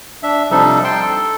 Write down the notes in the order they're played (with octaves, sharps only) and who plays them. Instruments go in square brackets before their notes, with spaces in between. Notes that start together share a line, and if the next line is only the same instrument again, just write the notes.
[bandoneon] D4 E5
C3 F3 G3 D4 D#4 A4
G5 A5 C6
A4